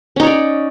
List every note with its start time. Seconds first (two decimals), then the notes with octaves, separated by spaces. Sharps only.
0.16 C#4
0.20 D#4
0.23 C#5
0.26 D5